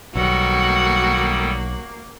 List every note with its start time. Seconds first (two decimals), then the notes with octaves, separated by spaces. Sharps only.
0.15 B1 D#3 G3 A#3 F#4 A4